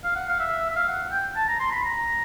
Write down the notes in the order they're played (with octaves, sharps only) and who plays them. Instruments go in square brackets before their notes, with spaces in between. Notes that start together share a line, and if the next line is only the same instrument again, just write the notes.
[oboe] F5
F#5
F5
E5
E5
F5
F#5
G5
A5
A#5
C6
B5
A#5